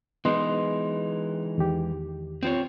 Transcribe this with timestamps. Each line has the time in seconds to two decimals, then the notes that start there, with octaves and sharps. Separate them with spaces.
0.25 E3 G#3 B3 D#4 D#5 C6
1.58 E2 D#3 G4
2.43 C4 F4 C#5